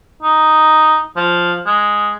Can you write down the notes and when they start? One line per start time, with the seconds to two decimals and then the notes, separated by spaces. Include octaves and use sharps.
0.23 D#4
1.17 F3
1.66 G#3